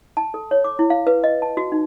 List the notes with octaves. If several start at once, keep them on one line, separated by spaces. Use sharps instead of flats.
A5
A4
C#5
D6
E4
F5
B4
D#5
A5
F#4
D#4